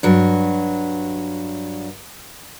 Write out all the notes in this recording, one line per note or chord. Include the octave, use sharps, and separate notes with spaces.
G2 F#3